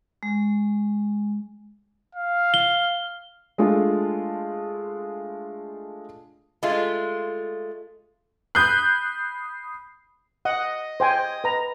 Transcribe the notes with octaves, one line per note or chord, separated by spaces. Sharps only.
G#3
F5
G7
G#3 A3 D4 F4
G#3 A3 F4
B5 D#6 F#6 G6 C7
D#5 F#5
C5 G5 G#5
B4 A#5